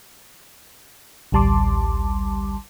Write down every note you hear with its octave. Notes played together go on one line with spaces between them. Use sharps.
A1 D2 G3 A5 C6 D6